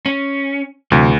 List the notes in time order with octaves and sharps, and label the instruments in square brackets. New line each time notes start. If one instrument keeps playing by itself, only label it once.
[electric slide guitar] C#4
[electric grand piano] D2 [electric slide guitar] C3 E3 F#3